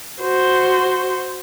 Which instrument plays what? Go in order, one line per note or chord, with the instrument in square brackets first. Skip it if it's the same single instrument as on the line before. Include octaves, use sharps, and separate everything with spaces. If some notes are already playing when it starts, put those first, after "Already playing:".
[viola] F#4 C5